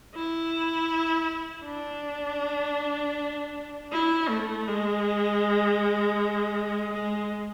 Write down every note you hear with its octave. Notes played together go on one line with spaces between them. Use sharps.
E4
D4
E4
A3
G#3
G#3